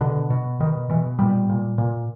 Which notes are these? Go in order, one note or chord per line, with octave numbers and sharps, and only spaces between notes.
B2 D3
B2
B2 D#3
B2 E3
A#2 G3
A#2
A#2